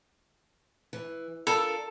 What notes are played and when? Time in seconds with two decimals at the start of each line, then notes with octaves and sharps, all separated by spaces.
0.93 E3
1.47 D4 F4 A4 A#4